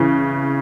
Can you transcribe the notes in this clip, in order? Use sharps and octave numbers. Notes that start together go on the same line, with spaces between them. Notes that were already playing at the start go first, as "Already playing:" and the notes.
Already playing: C#3 E3